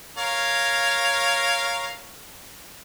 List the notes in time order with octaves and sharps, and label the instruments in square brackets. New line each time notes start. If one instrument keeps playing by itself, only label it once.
[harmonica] A#4 C#5 F5